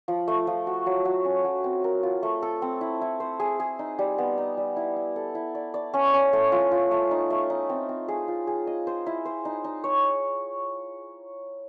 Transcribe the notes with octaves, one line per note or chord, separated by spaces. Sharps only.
F3
A3
F3
F#4
F#3
F#3
C#4
F#3
C4
A#4
F4
A3
A4
C4
E4
E4
C5
G#4
G#4
D#4
G3
B3
D#4
G3
E4
E4
A4
E4
D5
D5
C#4
C#4
A3
F4
F4
A3
D#4
A3
D#4
C4
C4
G#4
F4
G#4
D#5
C5
E4
C5
D#4
D#4
C#5